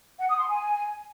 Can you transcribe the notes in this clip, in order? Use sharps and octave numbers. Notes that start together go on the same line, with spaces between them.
F#5
D#6
C6
G#5